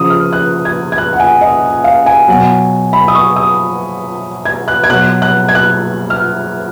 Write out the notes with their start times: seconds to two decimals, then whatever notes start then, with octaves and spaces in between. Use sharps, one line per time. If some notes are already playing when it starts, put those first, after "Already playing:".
Already playing: C#3 F3 D#6
0.10 F6
0.33 F#6
0.65 G#6
0.92 G#6
0.98 F#6
1.13 F#5
1.20 G#5
1.41 D#5
1.84 F5
2.06 G#5
2.28 B2 F#3
2.93 B5
3.08 D#6
3.15 C#6
3.36 D#6
4.45 G#6
4.68 F#6
4.84 G#6
4.89 B2 F#3 F#6
5.22 F#6
5.49 G#6
5.55 F#6
6.10 F6